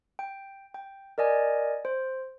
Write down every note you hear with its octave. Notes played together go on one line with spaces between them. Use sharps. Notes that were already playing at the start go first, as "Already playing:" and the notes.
G5
G5
A#4 D5 D#5 G#5
C5